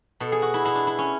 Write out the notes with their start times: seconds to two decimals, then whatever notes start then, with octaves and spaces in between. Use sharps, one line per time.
0.20 B2 A4
0.32 G#4
0.42 F#4
0.54 E4
0.65 B2 E4
0.75 D4
0.87 E4
0.98 C#4